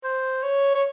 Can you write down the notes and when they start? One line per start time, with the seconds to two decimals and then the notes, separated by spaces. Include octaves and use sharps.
0.04 C5
0.43 C#5
0.75 C#5